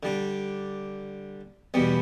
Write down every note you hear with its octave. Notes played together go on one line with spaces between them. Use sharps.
D3 G3 D4
E2 B2 G3 B3